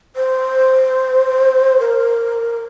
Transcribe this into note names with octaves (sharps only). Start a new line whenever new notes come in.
C5
A#4